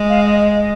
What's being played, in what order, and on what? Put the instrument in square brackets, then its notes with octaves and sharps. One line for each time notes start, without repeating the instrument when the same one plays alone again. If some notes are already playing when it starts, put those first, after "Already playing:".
Already playing: [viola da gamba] G#3
[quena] F5
D#5
D#5